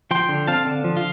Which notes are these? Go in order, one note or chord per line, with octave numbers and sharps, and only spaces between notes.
F3 G5 C6
D3
C4 F5 A5
D3
F3
F4